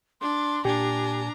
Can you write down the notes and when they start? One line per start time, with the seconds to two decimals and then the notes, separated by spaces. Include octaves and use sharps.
0.21 D4 C6
0.65 A#2 D4 G4 G#5 A#5